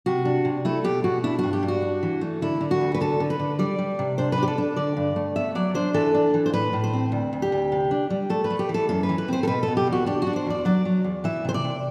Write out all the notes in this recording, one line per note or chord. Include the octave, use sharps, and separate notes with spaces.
C3 F#4
D4
C3
A3 E4
B2 G4
B2 F#4
D4 E4
G2 F#4
G4
G2
F#4
D4
E3
A3
D3 E4
D3
F#4
D2
B4
D3 A4
D3
B4
D3
G3 D5
G3
C3
D4 C5
B4
D4 G4
A4
D4
D3 D5
G2
A3
B3 E5
F#3 D5
D4 C5
E3 A4
D4
E3
C5
A2 B4
A2
C5
C4
D2
D2
G4
D2
C3
D4
G3
A3 A4
B4
A3
G4
E3
A4
F#2 A4
B4
E3
B4
C4 C5
A4
B2 B4
B2 A4
G4
E2
F#4
D4 G4
D4 F#4
C5
E2 D5
F#3 D5
F#3
E2
E3 E5
C3 C5
D5
C3